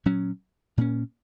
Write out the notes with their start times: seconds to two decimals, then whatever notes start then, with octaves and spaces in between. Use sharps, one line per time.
0.06 A#2 F#3 C#4
0.77 A#2 A#3 C#4